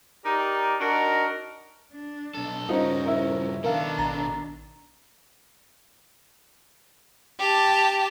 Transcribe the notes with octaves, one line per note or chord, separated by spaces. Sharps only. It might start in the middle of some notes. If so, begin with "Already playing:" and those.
D#4 G4 A#4 D5
D4 D#4 F#4 A#4
D4
B1 A4
G2 C#3 C#4 D#4 F4 F#4 A#4 C5
E4
B2 D#3 D4 A4 A#4 F5
A1 A#5
G4 A5